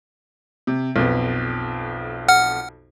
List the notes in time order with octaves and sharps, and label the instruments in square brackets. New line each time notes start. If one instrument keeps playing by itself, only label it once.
[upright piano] C3
B1 F2 B3
[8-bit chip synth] F#5 F6